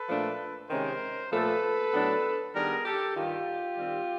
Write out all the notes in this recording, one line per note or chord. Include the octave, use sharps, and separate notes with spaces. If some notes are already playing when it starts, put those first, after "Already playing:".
Already playing: A4 B4
A#2 F3 A3 D4
C3 D#3 G#3 C#4 A#4 C5
A#2 F3 A3 A4 B4
A2 F#3 B3 D4
D#3 G3 B3 D4 G#4 A#4
G4 A4
G2 D#3 G3 F4 G4
D#3 G3 C4